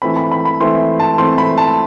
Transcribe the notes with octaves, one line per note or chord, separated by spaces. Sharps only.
E3 A3 C4 B5
B5
B5
B5
E3 A3 C4 C6
A5
E3 A3 C4 C6
B5
A5